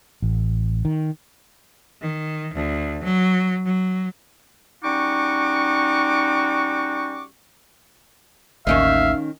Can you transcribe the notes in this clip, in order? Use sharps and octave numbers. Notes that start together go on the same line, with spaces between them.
A1
D#3
D#3
D2
F#3
F#3
G3 C#4 D#4 F#4 C#6 D6
A1 D#2 D#3 C#4 D#4 E5 F5